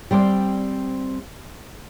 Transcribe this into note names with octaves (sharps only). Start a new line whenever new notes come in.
G3 C4 C5 D5